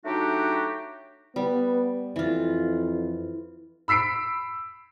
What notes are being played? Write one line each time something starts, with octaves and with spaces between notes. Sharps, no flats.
F#3 A3 D4 D#4 F#4 G4
G3 B3
F2 E3 F4
B5 E6 B6 C7 D7